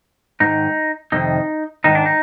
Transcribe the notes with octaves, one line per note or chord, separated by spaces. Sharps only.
G#2 D#3 D#4
F2 C3 D#3 D#4
G#2 D#3 D#4
D4
D#4